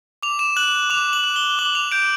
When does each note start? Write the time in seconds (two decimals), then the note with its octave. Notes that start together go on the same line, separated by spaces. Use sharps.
0.23 D6 F7
0.39 E7
0.57 F#6 F#7
0.90 D6 F7
1.13 F#7
1.24 F#6
1.36 G7
1.59 D6 F#7
1.75 F7
1.92 G6 D7